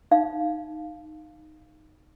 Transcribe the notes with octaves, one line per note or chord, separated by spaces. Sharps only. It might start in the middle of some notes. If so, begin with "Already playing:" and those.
D#4 F5